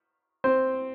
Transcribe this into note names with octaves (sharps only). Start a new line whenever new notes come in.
C4 C5